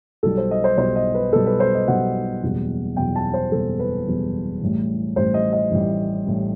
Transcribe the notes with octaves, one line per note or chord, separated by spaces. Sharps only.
B1 B2 G3 A4
C5
D#5
C5
B1 B2 G3 C5
D#5
B4
B1 B2 G3 A4
B4
C5
D#5
B1 B2 G3 F#5
F#1 E2 B2 G3
F#1 E2 B2 G3 G5
A5
C5
F#1 E2 B2 G3 A4
B4
F#1 E2 B2 G3
A1 A2 G3
A1 A2 G3 C5
D#5
D#5
A1 A2 G3
A1 A2 G3